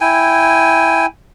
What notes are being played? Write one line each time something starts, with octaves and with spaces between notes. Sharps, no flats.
E4 G5 G#5